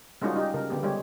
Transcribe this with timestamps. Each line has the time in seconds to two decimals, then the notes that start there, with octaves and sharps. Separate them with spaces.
0.22 G3 G#3 C#4 D#4 F4 F#4
0.34 G3 D#4 G4
0.54 C#3 A#4
0.70 D3 B3 G4
0.83 G3 G#3 G4 C#5